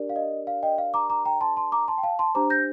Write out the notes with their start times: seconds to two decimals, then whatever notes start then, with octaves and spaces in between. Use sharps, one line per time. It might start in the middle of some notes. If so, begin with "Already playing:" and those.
Already playing: D4 G4 A#4 D5
0.09 F5
0.16 D#5
0.47 F5
0.63 D#5 G5
0.78 F5
0.94 A#5 D6
1.10 A#5 D6
1.25 G5 A#5
1.41 A5 C6
1.57 A5 C6
1.72 A#5 D6
1.88 A5 C6
1.98 G5
2.03 F5 A5
2.19 A5 C6
2.35 D4 G4 C5 A#5 D6
2.50 G6 A#6